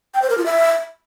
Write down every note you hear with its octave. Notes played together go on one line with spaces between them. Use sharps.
G5
C5
A#4
F4
E5